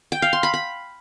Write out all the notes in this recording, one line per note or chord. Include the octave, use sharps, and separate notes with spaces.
G5
F5
C6
B5
B5